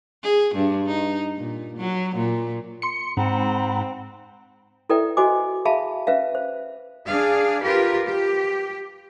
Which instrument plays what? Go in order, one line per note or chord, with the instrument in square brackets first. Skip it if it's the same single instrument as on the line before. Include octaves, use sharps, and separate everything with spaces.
[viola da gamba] G#4
G2
D#4
A#2
F#3
A#2
[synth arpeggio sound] C6 C#7
[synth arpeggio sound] G#2 [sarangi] C4 [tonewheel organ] F#5 A#5 B5
[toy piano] E4 A4 B4 D5 E5 G5
F#4 C5 D#5 G#5 D6
G#4 E5 F5 A5 B5
C#4 B4 E5 F5
C5
[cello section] D4 G#4 F5
F4 G4 A#4 B4
G4